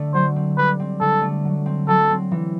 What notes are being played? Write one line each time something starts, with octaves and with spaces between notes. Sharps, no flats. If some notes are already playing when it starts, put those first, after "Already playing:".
Already playing: D3 A3
F#3 C5
C4
G3 B4
C4
D3 A4
A3
F#3
C4
F#3 A4
C4
E3